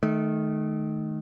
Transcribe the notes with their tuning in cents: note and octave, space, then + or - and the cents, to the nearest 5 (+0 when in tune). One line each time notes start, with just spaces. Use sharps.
D#3 +0 A3 -25